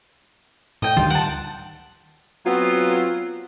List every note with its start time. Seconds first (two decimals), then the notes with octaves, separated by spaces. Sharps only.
0.82 A2 D#5 G5
0.97 D2 G2 D#3 F4
1.10 F#5 A5 D7
2.45 F#3 B3 C4 F4 F#4